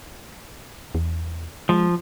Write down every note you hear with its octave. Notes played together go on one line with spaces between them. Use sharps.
E2
F3 G#3